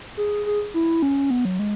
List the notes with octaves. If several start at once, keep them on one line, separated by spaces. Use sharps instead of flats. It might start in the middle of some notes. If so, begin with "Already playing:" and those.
G#4
G#4
E4
C#4
B3
F#3
G#3